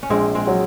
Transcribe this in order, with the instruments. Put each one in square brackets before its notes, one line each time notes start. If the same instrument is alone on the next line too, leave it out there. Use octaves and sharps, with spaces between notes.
[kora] C#4
[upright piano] A#1 [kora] G#3 C4
[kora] G#3 C4
[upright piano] F#3